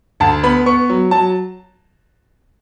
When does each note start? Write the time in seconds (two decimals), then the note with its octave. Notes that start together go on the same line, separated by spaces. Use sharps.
0.20 D2 A5
0.43 B3 B5
0.66 B3 C#6
0.90 F#3
1.11 F#3 A5